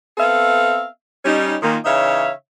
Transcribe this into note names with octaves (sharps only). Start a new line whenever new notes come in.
B3 C4 A4 E5 F5
G3 C#4 D#4
A#2 D#3 A#3
C#3 E3 D#4 C#5 E5 F5